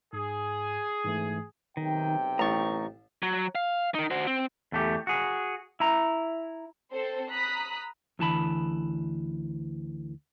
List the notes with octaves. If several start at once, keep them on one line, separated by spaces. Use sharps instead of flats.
G#2 G#4
G#2 E3 A3
B1 C3 D#3 G5
A1 A5 A#5 C#6
F#3
F5
D#4 A#4
F#4 C5
C4
E2 A3 G4
F#4 G#4
E4 A#5
C4 A4 C5
A#5 B5 D#6 F#6 B6
D2 E3 A5 B5